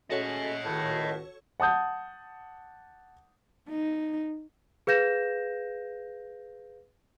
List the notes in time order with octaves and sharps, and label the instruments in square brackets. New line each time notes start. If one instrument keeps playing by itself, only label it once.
[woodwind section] G#3 A3 C#4 [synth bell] F#4 A4 C#5 [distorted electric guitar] D#5 F#5
[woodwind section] C#2 D#3 [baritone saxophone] A2
[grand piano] F#5 A5 D#6 G6
[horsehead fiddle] D#4
[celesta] G#4 B4 F5 G6 A#6 E7